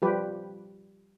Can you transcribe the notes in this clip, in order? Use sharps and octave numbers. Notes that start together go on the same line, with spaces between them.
F3 G3 G4 B4